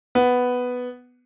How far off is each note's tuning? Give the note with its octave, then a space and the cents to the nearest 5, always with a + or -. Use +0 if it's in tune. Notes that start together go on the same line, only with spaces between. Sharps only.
B3 +5